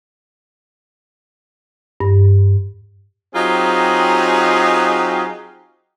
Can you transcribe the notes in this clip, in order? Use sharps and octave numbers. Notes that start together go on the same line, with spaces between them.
G2
F#3 C4 D#4 F4 G4 G#4